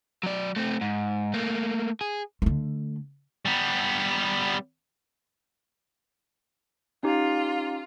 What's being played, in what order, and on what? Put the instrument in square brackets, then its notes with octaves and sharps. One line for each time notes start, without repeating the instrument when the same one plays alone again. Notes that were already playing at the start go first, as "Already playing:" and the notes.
[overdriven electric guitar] F#3 D5
A3 C4
G#2
A3 A#3
G#4
[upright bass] D3 A3
[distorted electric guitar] G3 B3
[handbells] C#4 D#4 G4 [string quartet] F4